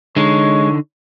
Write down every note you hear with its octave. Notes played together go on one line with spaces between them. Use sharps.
D3 G#3 D#4 C#5